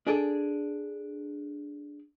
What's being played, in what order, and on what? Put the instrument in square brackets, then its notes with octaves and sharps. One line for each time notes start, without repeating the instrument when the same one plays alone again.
[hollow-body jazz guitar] D4 G#4 A4 D5